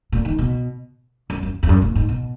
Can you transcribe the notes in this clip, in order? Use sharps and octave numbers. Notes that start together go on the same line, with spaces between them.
A#2
D#3
B2
F#2
F#2
E2
F#2
A#2
G#2
B2